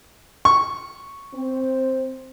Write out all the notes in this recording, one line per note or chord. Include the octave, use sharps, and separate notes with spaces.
C#6
C4 C5